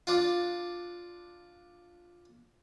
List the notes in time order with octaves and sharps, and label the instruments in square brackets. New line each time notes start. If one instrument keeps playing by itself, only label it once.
[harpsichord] D4 F4